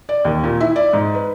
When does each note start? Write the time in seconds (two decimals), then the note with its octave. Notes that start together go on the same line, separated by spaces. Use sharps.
0.09 D5
0.25 D#2
0.44 A#2
0.60 E4
0.76 D5
0.93 G#2
1.15 B4